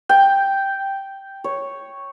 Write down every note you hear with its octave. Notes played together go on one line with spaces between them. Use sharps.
G5
C#5